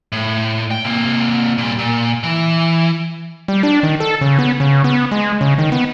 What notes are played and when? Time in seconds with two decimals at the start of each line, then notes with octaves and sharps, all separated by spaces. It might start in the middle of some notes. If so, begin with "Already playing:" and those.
0.12 A2
0.71 G5
0.84 C3 A#3
1.58 A#2 G3
1.79 A#2
2.23 E3
3.48 G3
3.63 D4
3.83 D#3
4.00 A4
4.21 C#3
4.39 B3
4.60 C#3
4.84 B3
5.12 G#3
5.41 C#3
5.58 D#3
5.72 B3